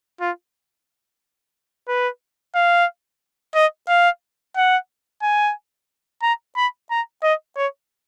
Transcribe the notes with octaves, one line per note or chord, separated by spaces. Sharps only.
F4
B4
F5
D#5
F5
F#5
G#5
A#5
B5
A#5
D#5
C#5